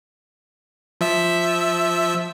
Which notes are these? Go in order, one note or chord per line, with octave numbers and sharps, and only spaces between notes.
F3 E5 E6